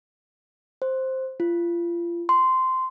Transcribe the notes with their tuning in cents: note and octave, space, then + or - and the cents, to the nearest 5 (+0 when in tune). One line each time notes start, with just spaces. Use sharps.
C5 +5
F4 -30
C6 -10